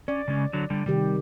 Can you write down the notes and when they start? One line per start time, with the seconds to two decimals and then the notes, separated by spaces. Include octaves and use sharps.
0.08 C#4 D5
0.28 C#3 G#3 C#4
0.53 D3 F#3
0.70 D3 G3
0.86 C3 D#3 G3 G4